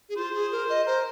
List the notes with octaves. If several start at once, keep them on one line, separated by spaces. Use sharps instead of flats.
G#4
F4 C5
G#4
A#4
D#5
A#4 C5